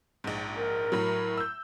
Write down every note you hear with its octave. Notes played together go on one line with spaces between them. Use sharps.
A#1 G#2
A#4
A2 F#3
E6 G6